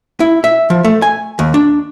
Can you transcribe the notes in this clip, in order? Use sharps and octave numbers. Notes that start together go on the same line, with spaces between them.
E4
E5
F3
A3
G#5
D#2
D4